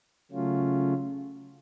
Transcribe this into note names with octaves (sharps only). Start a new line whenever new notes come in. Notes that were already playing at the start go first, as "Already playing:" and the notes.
C#3 F#3 A3 C#4 F4